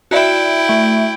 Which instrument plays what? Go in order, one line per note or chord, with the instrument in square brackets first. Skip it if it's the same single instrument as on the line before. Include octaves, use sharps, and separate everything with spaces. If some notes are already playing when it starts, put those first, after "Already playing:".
[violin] E4 G5 [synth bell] F#4 D5 E5
[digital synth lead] A3